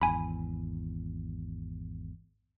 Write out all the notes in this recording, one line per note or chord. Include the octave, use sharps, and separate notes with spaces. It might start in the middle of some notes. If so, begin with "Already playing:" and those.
G#1 E2 G#5 B5